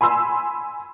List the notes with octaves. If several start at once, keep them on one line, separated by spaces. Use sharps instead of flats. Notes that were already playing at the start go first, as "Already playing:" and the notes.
G#5 B5 C6 E6